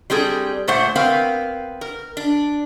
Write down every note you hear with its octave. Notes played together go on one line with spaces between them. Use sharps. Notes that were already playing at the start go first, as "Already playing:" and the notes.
G3 C4 G#4 A4
A#2 A3 C5 F#5
B3 C4 A#4 F5
A#4
D4